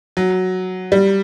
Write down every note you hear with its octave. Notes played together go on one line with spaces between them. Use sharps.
F#3
G3